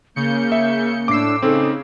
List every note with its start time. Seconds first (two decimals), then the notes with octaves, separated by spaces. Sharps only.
0.16 C#3 A#3 G6 C#7
0.52 E5
1.08 A2 D4 D6 E6 C7
1.42 C#3 C4 D#4 A4